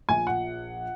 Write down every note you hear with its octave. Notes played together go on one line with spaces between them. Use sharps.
A#1 A#2 G#5
F#5